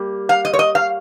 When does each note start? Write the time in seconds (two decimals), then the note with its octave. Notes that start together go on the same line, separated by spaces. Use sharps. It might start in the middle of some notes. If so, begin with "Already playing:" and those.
Already playing: G3 A#3
0.29 F5
0.45 D#5
0.53 C#5
0.59 D#5
0.75 F5